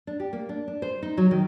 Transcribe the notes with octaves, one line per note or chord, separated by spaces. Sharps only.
D4
G4
A#3
D4
D4
C5
D#4
F#3
D#3